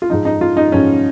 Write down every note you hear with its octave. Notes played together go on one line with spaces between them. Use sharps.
F4
G#2 F3 D#4
D#4
F4
D#4
G#2 F3 C#4